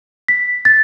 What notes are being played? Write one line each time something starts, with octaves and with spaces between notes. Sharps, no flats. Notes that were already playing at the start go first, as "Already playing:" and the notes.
B6
A6